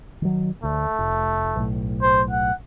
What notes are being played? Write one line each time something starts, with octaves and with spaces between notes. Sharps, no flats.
D#3 F#3
D2 A3
F1
B1 A2
C5
F#5